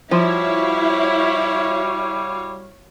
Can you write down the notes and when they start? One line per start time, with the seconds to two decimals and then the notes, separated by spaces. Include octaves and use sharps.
0.11 F3 G3 E4 F#4 C#5 F5